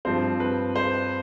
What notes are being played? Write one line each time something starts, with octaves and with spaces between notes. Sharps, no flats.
G2 F3 C4 C5
B4
C5